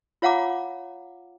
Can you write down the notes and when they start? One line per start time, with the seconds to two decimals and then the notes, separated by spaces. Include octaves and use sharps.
0.22 F4 C#5 F5 F#5 A#5 D6